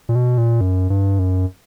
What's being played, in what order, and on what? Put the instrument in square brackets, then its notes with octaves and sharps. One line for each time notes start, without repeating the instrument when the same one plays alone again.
[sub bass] A#2
B2
A#2
F#2
G2
F#2